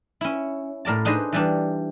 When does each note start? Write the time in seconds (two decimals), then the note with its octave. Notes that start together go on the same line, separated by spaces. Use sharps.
0.21 C#4 E4
0.85 A2 A#4 D5 A5
1.05 D4 D#4 G#4 B4 C5 D#5
1.33 E3 G3 D4